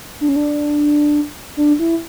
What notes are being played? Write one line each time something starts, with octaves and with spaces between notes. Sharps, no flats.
D4
C#4
D4
D4
E4